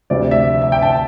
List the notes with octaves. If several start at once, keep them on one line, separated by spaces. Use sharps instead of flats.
D2 C3 F3 D5
E5
E5
G5
A5